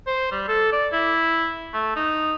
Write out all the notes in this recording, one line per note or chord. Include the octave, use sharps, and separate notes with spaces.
C5
G3
A4
D5
E4
A3
D#4